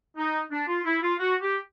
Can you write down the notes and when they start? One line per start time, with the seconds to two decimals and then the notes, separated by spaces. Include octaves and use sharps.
0.17 D#4
0.52 D4
0.68 F4
0.85 E4
1.02 F4
1.20 F#4
1.42 G4